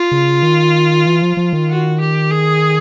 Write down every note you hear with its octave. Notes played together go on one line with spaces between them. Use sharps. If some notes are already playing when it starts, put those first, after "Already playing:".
Already playing: F4
C#3
D#3
E3
F3
F3
D#3
F#4
G4
G#4